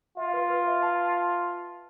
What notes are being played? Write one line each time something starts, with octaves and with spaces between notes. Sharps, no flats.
F4 E5
B4
B4
E5
A5